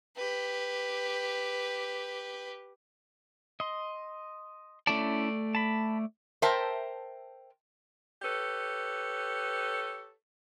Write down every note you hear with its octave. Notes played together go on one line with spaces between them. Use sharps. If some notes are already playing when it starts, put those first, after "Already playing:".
G4 B4
D#5 C6
A3 C#4 E4 D5 A5
A5 B5
A#4 C5 E5 G5 A5
G4 A4 B4 C#5